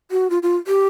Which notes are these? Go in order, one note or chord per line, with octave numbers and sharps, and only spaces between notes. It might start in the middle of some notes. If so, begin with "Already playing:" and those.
F#4
F4
F4
G4